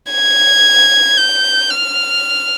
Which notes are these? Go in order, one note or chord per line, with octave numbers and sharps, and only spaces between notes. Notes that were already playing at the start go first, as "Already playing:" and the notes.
G#6
G6
F6